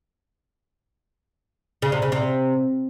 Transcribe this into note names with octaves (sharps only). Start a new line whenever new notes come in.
C#3
C3
C#3
C3